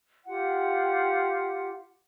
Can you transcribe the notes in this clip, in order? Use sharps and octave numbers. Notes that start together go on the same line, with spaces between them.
F4 G4 F#5